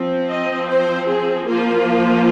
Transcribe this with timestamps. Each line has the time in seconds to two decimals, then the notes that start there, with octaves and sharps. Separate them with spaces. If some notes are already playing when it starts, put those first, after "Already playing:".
Already playing: F3 C4
0.29 D#5
0.68 C5
1.07 G#4
1.47 F3 A#3 F4